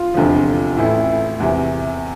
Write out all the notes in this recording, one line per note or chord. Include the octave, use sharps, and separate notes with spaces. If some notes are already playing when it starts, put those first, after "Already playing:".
Already playing: F4
F1 E2 D3 F3
A1 A2 E3 E4
E2 C3 E3